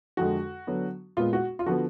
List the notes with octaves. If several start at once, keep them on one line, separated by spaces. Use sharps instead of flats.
F2 D3 G#3 F#4
D3 F#3 B3
A#2 G#3 B3 F4
F#4
F4
D3 F3 B3 F#4